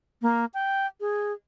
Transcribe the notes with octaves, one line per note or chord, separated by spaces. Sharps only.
A#3
G5
G#4